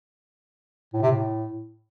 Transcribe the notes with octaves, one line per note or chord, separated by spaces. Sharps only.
A2
C3
A2